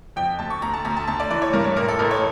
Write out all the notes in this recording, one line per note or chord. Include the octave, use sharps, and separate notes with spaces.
F2 G5
D2 A5
C#6
D2 A#5
A5
D2 A#5
A5
D2 A5
D5
E3 D5
C#5
G2 A#4
C#5
A1 A#4
A4
A1 A#4
C#5